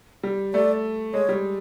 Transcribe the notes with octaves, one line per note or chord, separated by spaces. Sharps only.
G3
A3 D5
G#3 C#5
G3